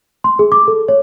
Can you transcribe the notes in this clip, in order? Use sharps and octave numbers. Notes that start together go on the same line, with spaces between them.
C6
G#4
D6
A4
C#5